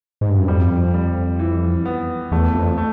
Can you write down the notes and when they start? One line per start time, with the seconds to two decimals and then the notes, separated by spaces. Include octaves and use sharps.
0.21 G#2
0.30 G2
0.39 F#2
0.47 F2 G3
0.94 G3
1.39 E3
1.86 B3
2.32 E2 A3
2.55 F2
2.78 A3